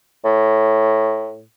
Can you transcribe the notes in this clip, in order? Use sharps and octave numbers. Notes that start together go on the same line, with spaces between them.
A2